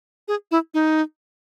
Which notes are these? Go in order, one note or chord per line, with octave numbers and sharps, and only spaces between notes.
G#4
E4
D#4